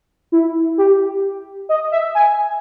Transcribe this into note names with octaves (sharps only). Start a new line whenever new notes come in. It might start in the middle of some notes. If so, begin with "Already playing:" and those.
E4
G4
D#5
E5
G#5